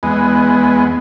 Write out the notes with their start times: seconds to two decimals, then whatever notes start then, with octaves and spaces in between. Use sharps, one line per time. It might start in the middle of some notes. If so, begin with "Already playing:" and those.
0.03 E2 G#3 B3